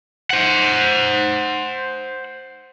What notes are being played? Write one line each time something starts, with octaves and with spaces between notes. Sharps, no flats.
C5 F#5